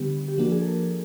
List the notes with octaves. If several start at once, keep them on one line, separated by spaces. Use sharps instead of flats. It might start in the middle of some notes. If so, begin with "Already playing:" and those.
Already playing: D3 G3 B3 G4
G4
F3 A#3 D4 F#4
G#4
A4
A#4